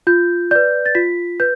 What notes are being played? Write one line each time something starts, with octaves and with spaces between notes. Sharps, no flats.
F4 G6
B4 D5 G6
A6
F4 B6
B4 G6